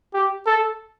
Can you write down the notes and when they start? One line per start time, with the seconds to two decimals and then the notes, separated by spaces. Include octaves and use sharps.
0.13 G4
0.46 A4